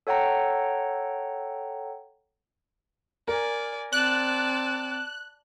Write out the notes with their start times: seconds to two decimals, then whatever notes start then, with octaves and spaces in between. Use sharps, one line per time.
0.07 A4 C#5 F#5 G5 A#5
3.28 A#4 D5 G#5
3.93 C4 D5 A5 F#6